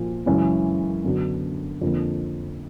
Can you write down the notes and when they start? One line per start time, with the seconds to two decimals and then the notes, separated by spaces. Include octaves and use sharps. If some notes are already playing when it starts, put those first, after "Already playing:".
Already playing: A#2 F3
0.26 F#2 C#3 E3 G#3 C#4
1.05 F#2 D3 F#3 B3 D4
1.81 F2 D3 F3 A#3 D4